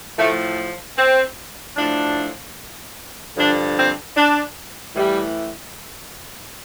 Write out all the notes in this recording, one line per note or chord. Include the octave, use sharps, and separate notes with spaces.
A2 F3 A3
C4
A2 F3 D4
G2 D3 F3 D4
C4
D4
A2 E3 G3